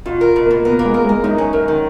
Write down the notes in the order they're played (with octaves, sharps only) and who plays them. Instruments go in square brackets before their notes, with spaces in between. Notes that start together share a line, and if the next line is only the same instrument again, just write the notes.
[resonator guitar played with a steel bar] B2 [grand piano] F4
[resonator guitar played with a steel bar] A#4
B2
[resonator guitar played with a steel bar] B2 [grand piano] A#3
[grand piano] B3 [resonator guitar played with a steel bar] A#4
[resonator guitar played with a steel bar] A#3
[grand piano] G#3
[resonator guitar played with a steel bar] A#4
[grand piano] G#3 [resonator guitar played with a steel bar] A#4
[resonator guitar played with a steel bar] F#2 [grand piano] D#4
[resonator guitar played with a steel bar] C#4
[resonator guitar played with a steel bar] F#2 [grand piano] A#4
[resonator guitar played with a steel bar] D#3